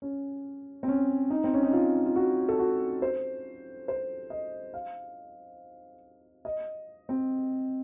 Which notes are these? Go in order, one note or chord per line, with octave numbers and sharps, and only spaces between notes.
C#4
C4
C#4
D#4
C4
C#4
D#4
F4
F4
F#4
A4
F#4
C5
C5
D#5
F5
D#5
C4